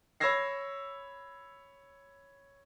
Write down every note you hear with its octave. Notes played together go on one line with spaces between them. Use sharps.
C#5 B5 E6 G#6 A#6 C7